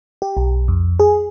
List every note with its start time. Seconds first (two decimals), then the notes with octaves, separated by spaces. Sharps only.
0.22 G4
0.37 B1
0.68 F2
1.00 G#4